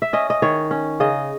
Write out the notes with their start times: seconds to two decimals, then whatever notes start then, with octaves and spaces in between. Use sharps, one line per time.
0.02 E5
0.13 C#4 D#5
0.30 D#5
0.42 D#3 C#5
0.71 C#4
1.00 C#3 D#5